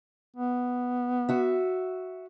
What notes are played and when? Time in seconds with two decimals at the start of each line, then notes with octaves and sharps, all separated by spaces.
0.37 B3
1.29 F#4 E5